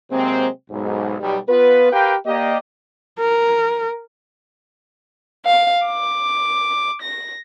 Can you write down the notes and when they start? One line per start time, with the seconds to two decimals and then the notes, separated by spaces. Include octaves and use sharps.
0.11 C3 F#3 G#3 A#3 C4
0.71 B1 G#2
1.19 B1 G3
1.49 B3 F4 B4
1.93 G4 A#4 B4 F5 G5
2.26 A#3 G4 D5 D#5
3.19 A#4
5.46 F5
5.86 D6
7.00 A#6